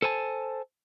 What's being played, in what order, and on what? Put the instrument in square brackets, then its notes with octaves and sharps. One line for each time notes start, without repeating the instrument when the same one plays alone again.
[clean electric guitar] A4 C5 G#5 A5